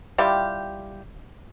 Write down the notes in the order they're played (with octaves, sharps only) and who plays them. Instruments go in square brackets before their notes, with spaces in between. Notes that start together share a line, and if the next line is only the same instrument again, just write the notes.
[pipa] G3 E4 F4 G4